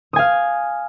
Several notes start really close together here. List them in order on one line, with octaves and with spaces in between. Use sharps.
D#6 G#5 F5